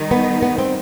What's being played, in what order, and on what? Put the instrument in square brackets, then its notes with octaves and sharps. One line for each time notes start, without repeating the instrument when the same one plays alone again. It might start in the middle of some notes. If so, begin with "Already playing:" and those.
Already playing: [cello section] D#3 G3 D#4
[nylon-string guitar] B3
B3
C4